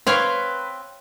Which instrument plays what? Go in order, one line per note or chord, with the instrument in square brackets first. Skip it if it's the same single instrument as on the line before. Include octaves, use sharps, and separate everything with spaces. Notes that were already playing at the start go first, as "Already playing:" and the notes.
[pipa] C4 [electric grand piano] B4 [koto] C#5 F5 G5